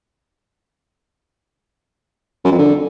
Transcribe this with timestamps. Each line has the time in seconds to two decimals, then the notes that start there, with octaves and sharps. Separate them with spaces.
2.45 F#2
2.52 F2
2.59 D3